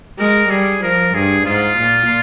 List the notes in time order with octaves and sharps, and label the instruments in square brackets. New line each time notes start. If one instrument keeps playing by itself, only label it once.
[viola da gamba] G#3 [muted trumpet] A#4
[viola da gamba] G3 [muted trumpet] G#4
[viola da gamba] F3 [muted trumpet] A#4
[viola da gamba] G2 [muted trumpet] G#4
[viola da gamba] G#2 [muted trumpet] F4
[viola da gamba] A#2